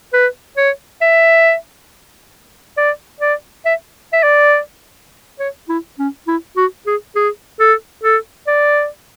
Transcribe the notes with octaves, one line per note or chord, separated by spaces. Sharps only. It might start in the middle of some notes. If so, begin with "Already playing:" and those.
B4
C#5
E5
D5
D5
E5
E5
D5
C#5
E4
C#4
E4
F#4
G#4
G#4
A4
A4
D5